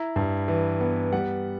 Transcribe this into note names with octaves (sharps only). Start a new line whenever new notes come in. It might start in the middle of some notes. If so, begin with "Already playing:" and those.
Already playing: E4 A#5
G2
E3
B3
G3 F#5